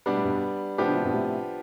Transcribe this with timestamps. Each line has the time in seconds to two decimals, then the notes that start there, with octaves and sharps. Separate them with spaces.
0.06 B2 G3 B3 D4
0.16 A2
0.24 G2 B2
0.78 A2 C3 F3 B3 D4 G4
0.87 B2 D3
0.96 A2 C3
1.04 G2 B2
1.13 A2 C3